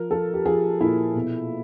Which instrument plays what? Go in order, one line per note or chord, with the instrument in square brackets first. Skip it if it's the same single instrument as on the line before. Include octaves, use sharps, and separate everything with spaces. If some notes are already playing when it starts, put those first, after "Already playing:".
Already playing: [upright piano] F3 A#4
F3 A4
G4
F3 G#4
A#2 E4
B2